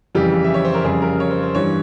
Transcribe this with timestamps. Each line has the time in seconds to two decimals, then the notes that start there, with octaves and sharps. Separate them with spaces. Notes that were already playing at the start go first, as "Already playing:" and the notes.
0.15 F2 C#3 E3 G3 G4
0.44 E5
0.54 C#5
0.65 C5
0.74 A#4
0.84 F2 C#3 G3 G#4
1.02 A#4
1.20 C#5
1.31 C5
1.43 C5
1.54 G2 E3 G3 C#5